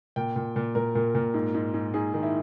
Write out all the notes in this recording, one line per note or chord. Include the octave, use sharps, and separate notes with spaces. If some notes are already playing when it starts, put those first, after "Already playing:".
A#2 G5
A#2
A#2
A#2 A#4
A#2
A#2
G#2
G#2
G#2
G#2 G#4
D#3
E4